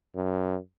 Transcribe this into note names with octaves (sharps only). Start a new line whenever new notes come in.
F#2